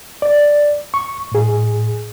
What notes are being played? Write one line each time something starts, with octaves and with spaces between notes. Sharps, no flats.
D5
C#6
A2 G#4